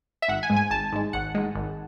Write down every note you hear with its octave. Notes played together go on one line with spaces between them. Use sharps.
E5
G#1 F#5
G#5
G#2 G#3
G#5
G#1 A5
G#2 G#3
G#1 F#5
G#2 G#3
G#1